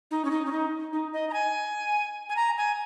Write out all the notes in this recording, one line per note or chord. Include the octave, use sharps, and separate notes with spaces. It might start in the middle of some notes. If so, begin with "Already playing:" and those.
D#4
C#4
D#4
C#4
D#4
D#4
D#5
A#5
G#5
G#5
A#5
G#5